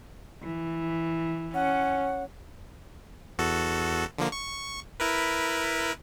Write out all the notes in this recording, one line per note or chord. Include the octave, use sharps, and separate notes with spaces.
E3
C#4 F#5
E2 F#4 A4
D3 F3 A#3
C#6
E4 A#4 B4